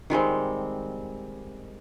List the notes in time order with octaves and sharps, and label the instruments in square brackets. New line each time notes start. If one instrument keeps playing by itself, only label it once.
[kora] D#3 G3 G#3 C4